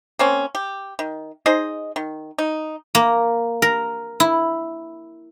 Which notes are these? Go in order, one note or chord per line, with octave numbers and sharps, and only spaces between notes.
A#3 C4 C#4
G4
D#3
D#4 G#4 C5 D#5
D#3
D#4
A#3
A#4
E4